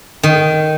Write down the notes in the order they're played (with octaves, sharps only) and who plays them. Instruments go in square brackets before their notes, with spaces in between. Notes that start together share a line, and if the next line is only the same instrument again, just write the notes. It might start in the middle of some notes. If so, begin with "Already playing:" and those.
[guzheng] D#3